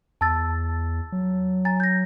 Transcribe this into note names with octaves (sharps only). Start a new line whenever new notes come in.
E2 A5 E6 A6
F#3
G#5 A#5 A6
G6 A#6